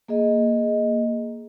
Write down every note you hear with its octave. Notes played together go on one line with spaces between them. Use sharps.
A#3 G#4 D#5